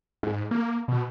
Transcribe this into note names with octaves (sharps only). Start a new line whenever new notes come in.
G#2
A#3
B2